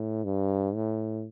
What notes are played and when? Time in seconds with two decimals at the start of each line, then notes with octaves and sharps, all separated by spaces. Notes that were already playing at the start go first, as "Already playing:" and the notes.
Already playing: A2
0.24 G2
0.75 A2